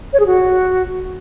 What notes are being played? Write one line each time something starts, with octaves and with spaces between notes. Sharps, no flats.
C#5
G#4
F#4